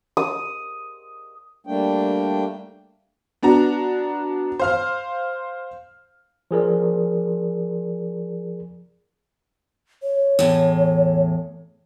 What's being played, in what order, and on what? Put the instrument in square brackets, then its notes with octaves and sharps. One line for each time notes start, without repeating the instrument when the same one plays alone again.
[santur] D#6
[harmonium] G3 A3 A#3 D4 G5
[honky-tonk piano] B3 D4 F#4 A#5
C5 F5 F6
[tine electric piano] F3 G#4 A#4 D5
[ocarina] C#5
[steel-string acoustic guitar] E2 A2